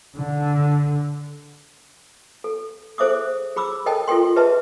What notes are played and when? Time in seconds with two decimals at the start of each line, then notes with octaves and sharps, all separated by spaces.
0.17 D3
2.44 A4
2.98 G#4 A4 C5 E5 D6 D#6
3.56 G#4 B5 D6 E6
3.86 A4 A#4 D#5 G5 A5
4.08 F4 A4 A#4 G5 C6
4.36 G#4 B4 D#5 E5 A5